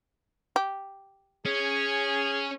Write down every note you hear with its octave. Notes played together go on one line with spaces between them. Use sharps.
G4
C#4 G#4